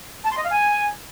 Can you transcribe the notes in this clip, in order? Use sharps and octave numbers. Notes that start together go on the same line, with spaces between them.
A5
C6
D#5
F5
G#5